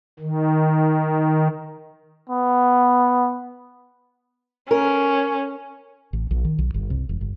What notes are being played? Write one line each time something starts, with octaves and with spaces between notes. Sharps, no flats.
D#3
B3
C#4 A#4
A1
A#1
D#3
B1
G1
C2
E1
G1